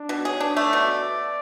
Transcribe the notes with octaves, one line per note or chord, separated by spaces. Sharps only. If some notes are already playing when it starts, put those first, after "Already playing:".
Already playing: D4
B2
G#4 C#5
D4
A3 D5
B2